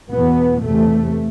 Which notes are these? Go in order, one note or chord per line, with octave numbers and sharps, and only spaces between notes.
E2 B2 B3
E2 C3 A3